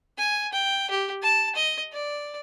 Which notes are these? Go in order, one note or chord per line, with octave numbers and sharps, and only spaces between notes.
G#5
G5
G4
A5
D#5
D5